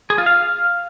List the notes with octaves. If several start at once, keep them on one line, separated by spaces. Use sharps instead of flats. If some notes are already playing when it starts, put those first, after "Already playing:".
G#4
F4
F5